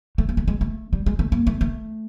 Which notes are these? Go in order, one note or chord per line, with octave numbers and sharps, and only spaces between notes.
A3
A#3
A3
G#3
A3
G3
G#3
A3
A#3
A3
A3